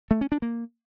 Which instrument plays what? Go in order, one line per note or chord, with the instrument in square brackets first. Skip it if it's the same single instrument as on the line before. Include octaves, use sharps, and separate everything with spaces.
[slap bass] A3
C#4
D4
A#3